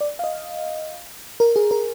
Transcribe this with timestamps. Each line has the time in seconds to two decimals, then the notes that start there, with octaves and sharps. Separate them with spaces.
0.01 D5
0.19 F5
0.24 D#5
1.40 A#4
1.56 G#4
1.71 A#4